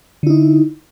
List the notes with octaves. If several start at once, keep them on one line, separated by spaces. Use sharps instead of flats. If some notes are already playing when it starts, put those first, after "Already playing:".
D3 D#4 E4